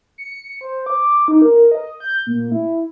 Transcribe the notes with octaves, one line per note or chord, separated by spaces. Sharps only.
C#7
C5
D6
D#4
A#4
D#5
G6
A#2
E4